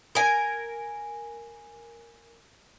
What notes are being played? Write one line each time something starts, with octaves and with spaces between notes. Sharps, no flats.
A#4 G#5